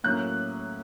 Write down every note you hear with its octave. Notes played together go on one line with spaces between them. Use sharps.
A2 F#3 A#3 C#4 F#6